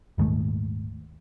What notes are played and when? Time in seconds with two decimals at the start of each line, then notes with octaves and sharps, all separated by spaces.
0.18 D#1 D#2 G#2 A3